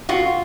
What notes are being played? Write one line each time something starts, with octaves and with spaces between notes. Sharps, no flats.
F4 F#4